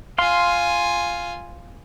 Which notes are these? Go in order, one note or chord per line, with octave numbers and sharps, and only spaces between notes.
F4 F5 G#5 C6